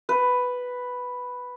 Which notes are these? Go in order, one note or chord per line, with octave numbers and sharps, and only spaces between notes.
B4